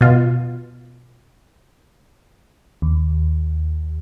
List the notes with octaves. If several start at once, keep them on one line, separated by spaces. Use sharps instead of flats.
B2 F4
D#2